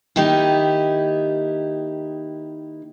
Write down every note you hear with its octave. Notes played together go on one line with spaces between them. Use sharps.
D#3 A#3 D#4 E4 G4